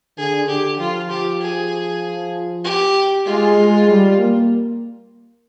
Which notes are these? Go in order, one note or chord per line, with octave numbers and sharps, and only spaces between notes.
D3 G#4
D3 G4
F3 F4
G4
G#4
G4
G#3 F4
G#3
G3
A#3